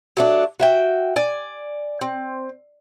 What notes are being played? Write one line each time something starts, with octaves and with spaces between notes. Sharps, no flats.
F#3 A3 D4
F#4 E5 G5
D5 G#5
C4